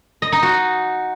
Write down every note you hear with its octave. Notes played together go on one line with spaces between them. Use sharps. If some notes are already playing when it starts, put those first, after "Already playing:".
D#5
D#4
F#4